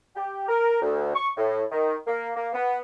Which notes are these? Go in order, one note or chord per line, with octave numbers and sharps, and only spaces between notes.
G4
A#4
D2
C#6
A2
D#3
A#3
A#3
B3